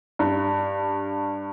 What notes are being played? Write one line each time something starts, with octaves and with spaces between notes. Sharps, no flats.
G2